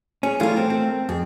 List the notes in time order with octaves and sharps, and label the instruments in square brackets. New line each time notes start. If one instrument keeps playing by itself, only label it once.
[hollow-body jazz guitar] C#4 [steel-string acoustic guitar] G#4
[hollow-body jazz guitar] E3 G3 F4 [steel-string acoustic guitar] A3 A#4
[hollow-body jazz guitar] C4
C4
[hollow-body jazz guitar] F2 [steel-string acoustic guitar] G#4